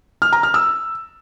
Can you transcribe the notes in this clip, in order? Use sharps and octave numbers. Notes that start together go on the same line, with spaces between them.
F6
A#5
F6
E6